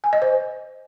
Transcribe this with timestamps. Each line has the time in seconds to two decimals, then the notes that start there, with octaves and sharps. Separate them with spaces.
0.04 G#5
0.13 D#5
0.22 C5